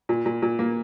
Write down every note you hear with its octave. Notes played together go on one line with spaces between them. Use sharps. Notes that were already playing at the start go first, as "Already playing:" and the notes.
A#2
A#2
A#2
A#3